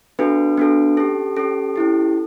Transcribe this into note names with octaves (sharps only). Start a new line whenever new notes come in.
B3 D4 F#4 A4 B4
B3 D4 F#4 A4
C#4 G4 A4
C#4 G4 A4
C#4 E4 G4